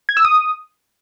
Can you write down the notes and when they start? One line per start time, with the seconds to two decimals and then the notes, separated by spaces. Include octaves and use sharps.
0.09 G#6
0.17 E6
0.25 D#6